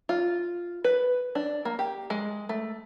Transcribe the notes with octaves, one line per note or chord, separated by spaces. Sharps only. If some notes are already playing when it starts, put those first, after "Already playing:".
F4
B4
D4
A#3
G4
G#3
A3